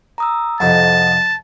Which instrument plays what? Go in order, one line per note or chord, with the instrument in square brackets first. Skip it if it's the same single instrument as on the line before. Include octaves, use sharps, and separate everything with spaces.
[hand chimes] A#5 D#6 E6
[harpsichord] C2 F2 D#4 [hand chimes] D#5 F#5 [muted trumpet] A5